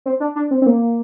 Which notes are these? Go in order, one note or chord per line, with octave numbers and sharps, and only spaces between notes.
C4
D4
D4
C4
C4
A#3